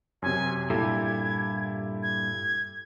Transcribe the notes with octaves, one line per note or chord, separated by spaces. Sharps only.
F#2 C3 G#5
G2 A#2 E4 G4 A4 G#6
G#6